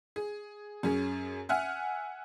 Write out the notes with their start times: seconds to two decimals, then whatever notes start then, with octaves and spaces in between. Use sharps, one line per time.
0.16 G#4
0.83 F#2 C#4 G#4
1.49 E5 F#5 G#5 F6